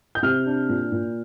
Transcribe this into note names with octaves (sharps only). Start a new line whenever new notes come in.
G6
C3 F6
D4
A#2
A#2